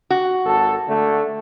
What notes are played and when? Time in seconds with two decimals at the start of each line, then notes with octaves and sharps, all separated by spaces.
0.10 F#4
0.45 G#1 A4
0.88 D3 A3